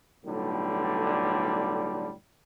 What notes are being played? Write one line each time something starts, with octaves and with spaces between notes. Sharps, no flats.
B1 A2 D3 G3